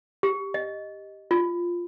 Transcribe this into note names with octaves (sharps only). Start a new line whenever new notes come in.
G4
D#5
F4